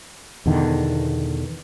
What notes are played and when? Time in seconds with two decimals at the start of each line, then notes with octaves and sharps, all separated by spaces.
0.46 E2 B2 D3 D#3